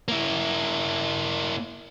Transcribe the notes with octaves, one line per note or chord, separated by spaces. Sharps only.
A#3 E4